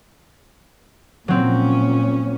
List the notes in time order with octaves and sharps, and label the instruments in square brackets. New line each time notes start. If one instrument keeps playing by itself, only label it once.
[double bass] A#2 C#4 [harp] F#3 C4